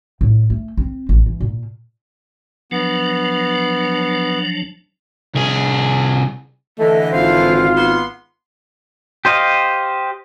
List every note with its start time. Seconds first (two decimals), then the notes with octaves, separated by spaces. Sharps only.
0.21 A2
0.50 A3
0.77 C4
1.09 A1
1.26 E3
1.40 A#2
2.71 F3 F#3 B3 D4
5.35 C2 G#4
6.79 D3 E3 A3 D#5
7.12 G#1 F4 C5 F5
7.75 B3 D#4 C6
9.25 G4 C5 D#5 F5